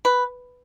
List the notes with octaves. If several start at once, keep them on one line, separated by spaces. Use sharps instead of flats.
B4